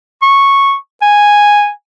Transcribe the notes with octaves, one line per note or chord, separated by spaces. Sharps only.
C#6
G#5